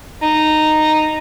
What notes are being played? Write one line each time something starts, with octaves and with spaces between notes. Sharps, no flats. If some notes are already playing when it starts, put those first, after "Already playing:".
D#4